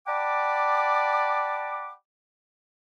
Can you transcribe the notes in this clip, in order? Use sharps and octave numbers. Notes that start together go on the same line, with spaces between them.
D5 F#5 G5 A5 B5 D6